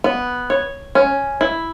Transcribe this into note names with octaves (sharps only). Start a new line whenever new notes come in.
B3
C#5
C#4
E4